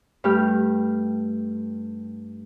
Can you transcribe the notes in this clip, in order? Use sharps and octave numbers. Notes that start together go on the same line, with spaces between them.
G2 A3 G4 F6